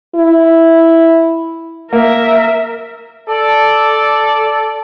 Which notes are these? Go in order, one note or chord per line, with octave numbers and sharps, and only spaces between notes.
E4
A#3 A#4 E5
A4 D5